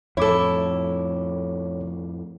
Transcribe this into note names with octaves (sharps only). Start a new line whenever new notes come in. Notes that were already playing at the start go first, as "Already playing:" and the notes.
F2 A2 E4 A4 C#5 D6